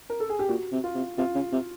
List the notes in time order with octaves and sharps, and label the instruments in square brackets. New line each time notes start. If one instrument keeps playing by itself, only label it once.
[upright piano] A#4
A4
G#4
G4
[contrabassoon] A#2 [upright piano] F#4
[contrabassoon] C3
[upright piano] F4
[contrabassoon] C3
[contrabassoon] C3 [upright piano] F4
[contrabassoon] C#3
C3